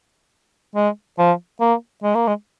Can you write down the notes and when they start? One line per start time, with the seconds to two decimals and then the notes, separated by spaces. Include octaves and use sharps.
0.76 G#3
1.19 F3
1.61 A#3
2.03 G#3
2.15 A#3
2.28 G#3